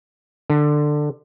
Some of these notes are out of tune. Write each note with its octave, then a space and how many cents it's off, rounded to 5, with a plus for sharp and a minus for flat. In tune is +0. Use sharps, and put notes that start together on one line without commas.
D3 +15